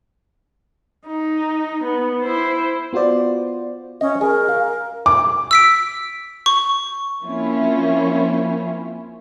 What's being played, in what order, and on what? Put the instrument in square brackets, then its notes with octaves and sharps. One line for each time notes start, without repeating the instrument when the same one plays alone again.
[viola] D#4
B3
E4 C5
[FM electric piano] B3 F4 F#4 C5 D5
[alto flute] C#4 [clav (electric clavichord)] D#5
[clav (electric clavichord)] G#4 [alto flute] A#4
[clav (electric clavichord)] F5
[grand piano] D6
[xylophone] E6 B6 D7
C#6
[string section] F3 A#3 C4 C#4 E4 F4